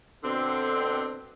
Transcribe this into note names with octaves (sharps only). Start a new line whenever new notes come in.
B2 D3 C4